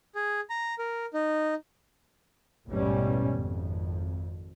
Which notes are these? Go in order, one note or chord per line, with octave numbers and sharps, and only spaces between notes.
G#4
A#5
A#4
D#4
A1 E2 G#2 B2 G3 C#4
G#1 F2